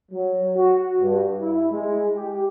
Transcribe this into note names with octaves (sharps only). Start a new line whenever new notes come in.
F#3
F#4
G2
E4
G#3
G4